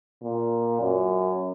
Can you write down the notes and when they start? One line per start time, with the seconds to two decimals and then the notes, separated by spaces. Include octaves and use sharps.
0.24 A#2
0.81 F#2